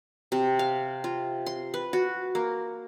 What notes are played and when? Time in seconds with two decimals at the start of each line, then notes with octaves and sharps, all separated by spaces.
0.32 C3
0.59 F5
1.04 F4
1.46 C6
1.74 B4
1.93 F#4
2.35 A#3